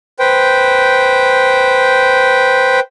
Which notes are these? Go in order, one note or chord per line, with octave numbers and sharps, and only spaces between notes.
B4 C5 G5